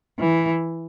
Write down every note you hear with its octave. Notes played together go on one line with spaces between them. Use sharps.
E3